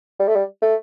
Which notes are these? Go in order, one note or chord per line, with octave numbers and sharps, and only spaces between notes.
G3
A3
G3
A3